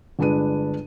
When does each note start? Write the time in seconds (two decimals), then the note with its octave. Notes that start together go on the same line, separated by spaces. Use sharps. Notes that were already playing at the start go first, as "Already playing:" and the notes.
0.19 G1 G#3 D4 B4 D#7